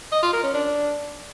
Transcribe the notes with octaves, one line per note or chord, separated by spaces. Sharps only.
D#5
F4
A#4
C#4
D4